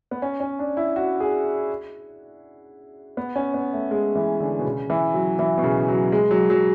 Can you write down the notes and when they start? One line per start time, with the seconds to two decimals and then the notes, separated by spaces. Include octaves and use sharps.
0.11 B3
0.22 C#4
0.40 C#4
0.59 D4
0.77 E4
0.96 F#4
1.20 G#4
3.17 B3
3.36 C#4
3.54 B3
3.73 A3
3.91 G#3
4.15 E3
4.40 D3
4.59 B2
4.65 C#3
4.90 E3
5.14 F#3
5.39 E3
5.58 B2
5.64 C#3
5.88 F#3
6.12 G#3
6.31 F#3
6.50 F#3